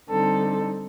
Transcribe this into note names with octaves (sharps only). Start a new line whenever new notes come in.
D3 G3 C4 D#4 A4